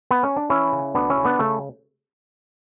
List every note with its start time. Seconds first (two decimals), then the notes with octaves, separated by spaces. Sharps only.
0.11 B3
0.23 C#4
0.36 D4
0.50 E3 C#4 E4
0.72 C#3
0.95 D2 B3 D4
1.10 C#4 E4
1.17 C#3
1.25 B3 D4
1.39 C#3 A3